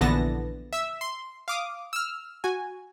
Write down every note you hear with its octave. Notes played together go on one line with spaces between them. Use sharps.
A#1 D3 E3 B3 A5 A#6
E5 E6
C6
F5 D6 D#6
E6 F6
F#4 G#5